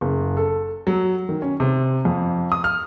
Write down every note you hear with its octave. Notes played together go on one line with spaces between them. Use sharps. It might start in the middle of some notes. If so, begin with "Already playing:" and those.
F#1
A4
F#3
D#3
C#4
C3
F2
D#6
F6